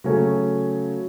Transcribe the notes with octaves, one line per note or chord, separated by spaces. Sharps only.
C#3 F#3 A3 C#4